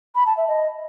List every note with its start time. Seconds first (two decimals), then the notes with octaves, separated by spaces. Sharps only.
0.15 B5
0.26 A5
0.37 E5
0.48 D#5